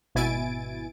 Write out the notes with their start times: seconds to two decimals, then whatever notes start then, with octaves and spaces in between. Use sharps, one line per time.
0.15 G#1 B2 E4 G#5 A6 D7